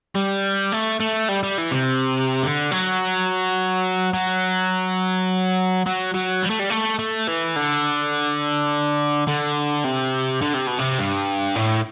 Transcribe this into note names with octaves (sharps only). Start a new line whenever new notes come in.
G3
A3
A3
G3
G3
E3
C3
D3
F#3
F#3
F#3
F#3
G3
A3
G3
A3
A3
E3
D3
D3
C3
D3
C3
B2
C3
G2
A2